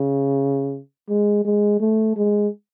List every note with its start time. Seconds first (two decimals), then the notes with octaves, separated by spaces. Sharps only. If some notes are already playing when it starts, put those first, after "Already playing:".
Already playing: C#3
1.09 G#3
1.44 G#3
1.80 A3
2.16 G#3